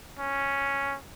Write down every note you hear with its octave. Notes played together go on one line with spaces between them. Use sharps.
C#4